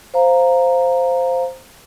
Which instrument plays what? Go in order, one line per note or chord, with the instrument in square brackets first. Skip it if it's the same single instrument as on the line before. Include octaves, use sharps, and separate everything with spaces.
[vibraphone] C5 F5 A#5